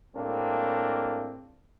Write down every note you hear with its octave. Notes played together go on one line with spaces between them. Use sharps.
A2 G#3 A#3 C4 D4